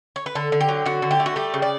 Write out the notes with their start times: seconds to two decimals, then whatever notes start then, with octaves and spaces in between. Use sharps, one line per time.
0.16 C#5
0.26 B4
0.35 D3 A4
0.52 D3
0.61 G4
0.69 F#3
0.86 D3 F#4
1.02 D3
1.11 G4
1.20 A3
1.26 F#4
1.36 G3 G4
1.54 C#3
1.62 D5